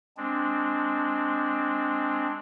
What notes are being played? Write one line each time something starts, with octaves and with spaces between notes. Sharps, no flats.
G#3 C4 D4